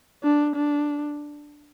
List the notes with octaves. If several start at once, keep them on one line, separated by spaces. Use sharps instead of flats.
D4
D4